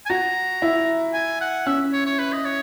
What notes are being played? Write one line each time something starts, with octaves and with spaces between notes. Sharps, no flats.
G#5
F#4 A#5
E4
G#5
F#5
C#4 E5
C#5
C#5
B4
D#5
C#5